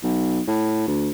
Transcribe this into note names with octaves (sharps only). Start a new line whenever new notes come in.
B1
A2
D2